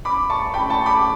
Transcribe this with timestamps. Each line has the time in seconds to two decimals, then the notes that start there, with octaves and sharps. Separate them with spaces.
0.05 B5 D6
0.30 A5 C#6
0.54 G5 B5
0.70 A5 C#6
0.86 B5 D6